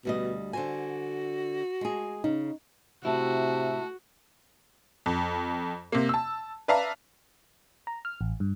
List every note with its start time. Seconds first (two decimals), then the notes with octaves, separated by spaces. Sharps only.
0.05 D2 B2 G3 D#5
0.53 D3 F#4 C5 G#5
1.81 G#3 G#4
2.24 C#3 D#4
3.05 C3 A3 E4 F#4 A5
5.06 F2
5.92 C3 A#3
6.09 A5 E6
6.68 B4 D5 E5 F5 A5 A#5
7.87 A#5
8.05 F6
8.21 A1
8.40 G2